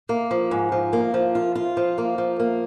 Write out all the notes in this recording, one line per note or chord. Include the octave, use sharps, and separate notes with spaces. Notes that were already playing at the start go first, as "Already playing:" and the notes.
A#3
F3
G#2
F3
A#3
F3
F4
F4
F3
A#3
F3
A#3